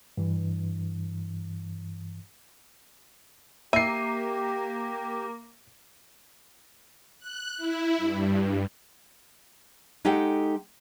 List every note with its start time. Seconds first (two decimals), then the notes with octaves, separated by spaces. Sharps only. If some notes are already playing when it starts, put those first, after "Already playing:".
0.17 G2 E3
3.73 A#3 G4 E5 C7 D#7
7.19 F#6
7.57 E4
7.97 G2
10.05 G#3 D#4 G4 A4 F#5 G5